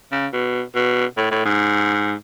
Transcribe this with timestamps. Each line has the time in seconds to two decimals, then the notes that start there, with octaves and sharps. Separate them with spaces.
0.12 C#3
0.33 B2
0.75 B2
1.17 A2
1.31 A2
1.46 G#2